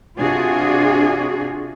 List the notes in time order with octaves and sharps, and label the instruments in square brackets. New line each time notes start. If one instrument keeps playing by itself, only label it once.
[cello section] C3 D4 F4 F#4 G#4